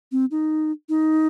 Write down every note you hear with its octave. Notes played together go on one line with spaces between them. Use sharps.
C4
D#4
D#4